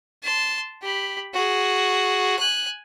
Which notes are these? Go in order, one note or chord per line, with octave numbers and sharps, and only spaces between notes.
A5 C6
G4 B5
F#4 G#4
G#5 F#6